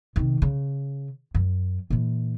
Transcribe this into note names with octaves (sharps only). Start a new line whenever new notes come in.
C3 D#3
C#3
F#2
A#2 E3